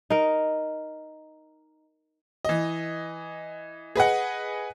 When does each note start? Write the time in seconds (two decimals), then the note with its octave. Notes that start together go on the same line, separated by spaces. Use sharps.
0.10 D#4 A#4
2.45 E3 D#5
3.96 G#4 B4 D#5 F#5